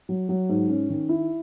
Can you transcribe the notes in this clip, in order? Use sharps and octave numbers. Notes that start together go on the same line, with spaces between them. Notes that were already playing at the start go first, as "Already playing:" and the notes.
F#3
F#3
G#2
C#4
D#3
E4